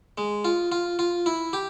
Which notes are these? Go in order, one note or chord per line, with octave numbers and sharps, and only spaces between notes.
G#3
F4
F4
F4
E4
G4